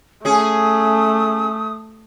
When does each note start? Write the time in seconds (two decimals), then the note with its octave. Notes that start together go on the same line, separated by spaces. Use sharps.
0.25 A3 C#4 G#4 D#6